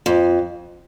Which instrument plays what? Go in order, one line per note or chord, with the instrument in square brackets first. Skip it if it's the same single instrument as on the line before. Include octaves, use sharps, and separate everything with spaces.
[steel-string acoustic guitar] F2